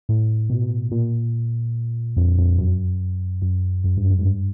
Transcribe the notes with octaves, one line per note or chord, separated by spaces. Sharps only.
A2
B2
A#2
F2
F2
F#2
F#2
F#2
G2
F#2
G#2
G2